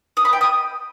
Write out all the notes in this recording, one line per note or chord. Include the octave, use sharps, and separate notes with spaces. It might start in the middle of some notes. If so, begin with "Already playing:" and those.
D#6
B5
G5
D#6